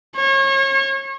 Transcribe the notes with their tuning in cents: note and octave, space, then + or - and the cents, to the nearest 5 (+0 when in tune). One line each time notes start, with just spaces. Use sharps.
C#5 -35